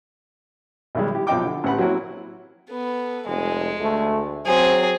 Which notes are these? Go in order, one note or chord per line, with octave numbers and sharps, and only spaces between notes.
B1 D#3 G3 G#3
E4 G4
B1 C3 F3 D#5 G5 D6
D3
A1 G4 B4 F#5 B5
F#3 A#3 C4 C#4 E4 F#4
B3 A4
F1 G#3
D2 A3
F#3 C4 G#4 C5